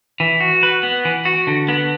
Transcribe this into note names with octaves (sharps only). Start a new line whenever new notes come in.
E3
F#4
B4
B3
E3
F#4
D3
B3